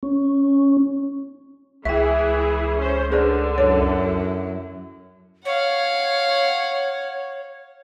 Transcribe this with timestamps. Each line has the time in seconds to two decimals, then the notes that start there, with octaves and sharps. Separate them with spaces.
0.03 C#4
1.85 C#2 E3 E4 G#4 E5 G5
2.78 C#4 C5
3.12 D3 G#4 B4 D5
3.58 F#2 E4 C#5
5.45 C#5 F5 F#5